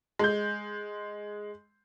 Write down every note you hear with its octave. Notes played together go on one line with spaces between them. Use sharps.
G#3 G6